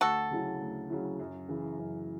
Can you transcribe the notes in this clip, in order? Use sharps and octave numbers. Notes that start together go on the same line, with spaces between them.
D2 F#4 A4
C#3 F#3 C#4 E4
D2
C#3 F#3 C#4 E4
F#2
C#3 E3
F#2